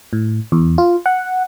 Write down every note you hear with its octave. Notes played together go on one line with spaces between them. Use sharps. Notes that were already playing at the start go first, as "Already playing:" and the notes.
A2
E2
F4
F#5